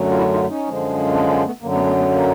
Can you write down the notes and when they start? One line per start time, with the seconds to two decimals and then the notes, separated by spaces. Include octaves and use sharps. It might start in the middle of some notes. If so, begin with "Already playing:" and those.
Already playing: F#2 D3 F#3 A3
0.11 F4
0.17 E4 F#4
0.33 D#4 F4
0.50 C#4 D#4
0.66 F#2 D3 F3 G#3
1.13 C4 D4
1.30 B3 C#4
1.46 A3 B3
1.62 F#2 D3 F#3 A#3
1.74 A3 B3
1.86 A3 B3
1.98 A3 B3
2.10 A#3